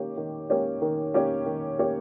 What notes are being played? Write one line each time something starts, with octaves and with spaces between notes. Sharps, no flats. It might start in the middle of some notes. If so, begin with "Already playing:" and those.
Already playing: D#3 A#3 C#4 G4 C#5
D#3
A#3 C#4 G4 C#5
D#3
A#3 C#4 G4 C#5
D#3
A#3 C#4 G4 C#5